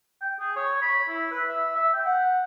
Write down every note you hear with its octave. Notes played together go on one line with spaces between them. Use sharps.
G5
G#4
C#5
B5
E4
B4
E5
E5
G5
F#5